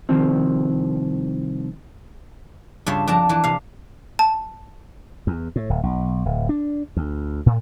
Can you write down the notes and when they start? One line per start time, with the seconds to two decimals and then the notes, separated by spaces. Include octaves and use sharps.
0.09 C2 D#3 F3 C4
2.86 G2 C#3 F4 E5
3.07 F2 D4 A#4 A5 A#5
3.29 E3 D4
3.44 C3 F5
4.19 A5
5.27 E2
5.56 A2
5.70 D1
5.83 B1
6.25 D1
6.49 D4
6.97 D2
7.46 A2